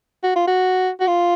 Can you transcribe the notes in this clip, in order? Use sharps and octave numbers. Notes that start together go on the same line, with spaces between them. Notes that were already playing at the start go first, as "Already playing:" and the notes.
F#4
F4
F#4
F#4
F4